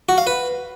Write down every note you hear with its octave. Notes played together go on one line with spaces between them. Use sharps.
F#4
F5
B4